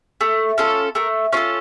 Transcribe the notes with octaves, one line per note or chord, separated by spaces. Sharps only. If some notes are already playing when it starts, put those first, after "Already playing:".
A3
C#4 F4 A4
A3 A#4
C#4 F4 A4 C#5